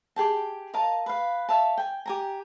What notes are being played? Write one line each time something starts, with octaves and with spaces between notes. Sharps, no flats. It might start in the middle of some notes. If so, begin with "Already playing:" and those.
G4 G#4 G5 A5
A#4 D#5 F5 A5
B4 F5
C#5 E5 F5 A5
G5 G#5
G4 G#5 A#5